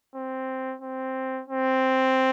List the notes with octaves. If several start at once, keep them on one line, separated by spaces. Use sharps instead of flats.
C4
C4
C4